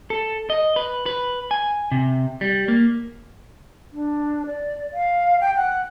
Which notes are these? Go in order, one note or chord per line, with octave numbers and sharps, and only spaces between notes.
A4
D#5
B4
B4
G#5
C3
G3
A#3
D4
D5
F5
G5
F#5